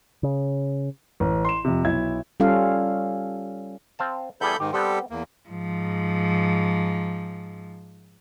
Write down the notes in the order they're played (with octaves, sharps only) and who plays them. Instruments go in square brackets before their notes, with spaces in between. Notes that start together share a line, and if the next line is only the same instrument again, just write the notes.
[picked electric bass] C#3
[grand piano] A1
C6 E7
F2 C3
B1 E4 G#6
[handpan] G3 C#4 F4 A4 F5
[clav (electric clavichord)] C4 F5 A5
[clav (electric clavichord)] E2 G3 G#4 [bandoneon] A4 B5 G6
[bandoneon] G#2 D#3 [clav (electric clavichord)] G4
[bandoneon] G3 G4 A4 [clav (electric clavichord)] B3 C4
[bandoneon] E2 A#3
[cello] G#2 F3